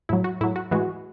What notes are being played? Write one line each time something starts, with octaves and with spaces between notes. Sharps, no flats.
A2 F#3 E4
F#4
A2 F#3 E4
F#4
A2 E3 G#3 F#4